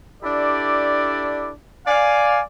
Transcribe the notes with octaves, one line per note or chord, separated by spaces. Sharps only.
D4 E4 G4 A4 D5
D5 F5 G#5